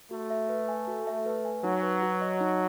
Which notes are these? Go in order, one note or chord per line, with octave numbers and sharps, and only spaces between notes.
A3 F#4
E5
B4
G#5
F#4
E5
B4
G#5
F#3 D#4
B4
F#4
D#5
D#4